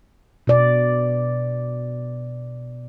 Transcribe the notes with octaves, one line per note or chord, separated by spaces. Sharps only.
B2 D5